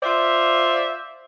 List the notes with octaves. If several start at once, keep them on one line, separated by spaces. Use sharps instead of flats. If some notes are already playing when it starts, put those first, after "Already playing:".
F4 C5 D5 E5